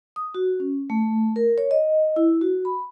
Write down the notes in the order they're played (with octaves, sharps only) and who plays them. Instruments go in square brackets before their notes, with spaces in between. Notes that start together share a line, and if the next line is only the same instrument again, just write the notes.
[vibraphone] D#6
F#4
C#4
A3
A#4
C#5
D#5
E4
F#4
B5